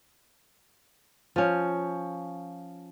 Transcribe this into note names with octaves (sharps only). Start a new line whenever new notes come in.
F3 C#4